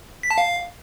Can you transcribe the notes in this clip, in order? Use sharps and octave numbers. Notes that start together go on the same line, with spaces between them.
B6
A5
F5